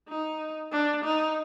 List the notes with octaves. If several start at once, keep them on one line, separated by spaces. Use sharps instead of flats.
D#4
D4
D#4